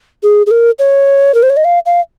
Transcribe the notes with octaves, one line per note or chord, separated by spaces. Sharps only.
G#4
G#4
A#4
C#5
A#4
C5
C#5
D#5
F5
F5